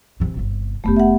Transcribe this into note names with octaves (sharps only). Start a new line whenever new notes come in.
C3 E3
G1 C3
F1 D3 A3 B3 G4
E5 F#5